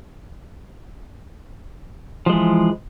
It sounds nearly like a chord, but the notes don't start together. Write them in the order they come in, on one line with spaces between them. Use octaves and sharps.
F3 G#3 E3